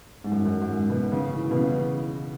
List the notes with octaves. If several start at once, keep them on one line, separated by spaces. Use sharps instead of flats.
G#2
F#2
G#2
F#2
F#2
G#2
B2
C#3
E3
B2
C#3